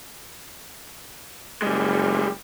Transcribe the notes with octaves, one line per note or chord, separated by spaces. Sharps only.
F#1 G3 G#3